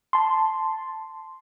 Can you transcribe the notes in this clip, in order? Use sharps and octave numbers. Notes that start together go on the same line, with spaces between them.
A5 C6